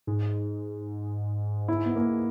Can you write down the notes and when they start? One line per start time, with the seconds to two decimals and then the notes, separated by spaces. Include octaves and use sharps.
0.07 G#2
1.68 E4
1.85 B3
1.96 A#3